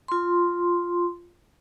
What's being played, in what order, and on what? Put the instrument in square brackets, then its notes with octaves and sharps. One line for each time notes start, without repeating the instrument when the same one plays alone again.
[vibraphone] F4 C6